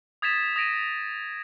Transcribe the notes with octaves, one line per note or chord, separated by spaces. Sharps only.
D#6 G#6 A6 B6 E7
D#6 A#6 D7 D#7